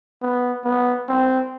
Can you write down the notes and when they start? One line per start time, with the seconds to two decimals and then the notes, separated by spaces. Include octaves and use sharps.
0.22 B3
0.65 B3
1.09 C4